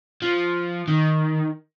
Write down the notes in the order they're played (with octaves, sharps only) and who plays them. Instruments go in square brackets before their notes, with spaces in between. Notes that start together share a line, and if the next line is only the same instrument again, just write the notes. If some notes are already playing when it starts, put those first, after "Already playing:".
[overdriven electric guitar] F3
D#3